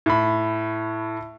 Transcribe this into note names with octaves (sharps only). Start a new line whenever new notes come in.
A2 B5